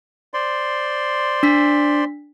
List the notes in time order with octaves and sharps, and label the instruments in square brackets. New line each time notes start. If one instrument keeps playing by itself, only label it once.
[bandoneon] C5 D5 C6
[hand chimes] D4 B6